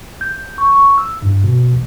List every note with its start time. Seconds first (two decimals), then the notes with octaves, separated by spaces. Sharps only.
0.21 G6
0.58 C#6
0.73 C#6
0.98 E6
1.22 G2
1.44 B2
1.73 A1